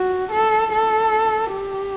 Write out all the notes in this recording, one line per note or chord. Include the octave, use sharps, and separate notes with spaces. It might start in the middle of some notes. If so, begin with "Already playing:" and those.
Already playing: F#4
A4
A4
G4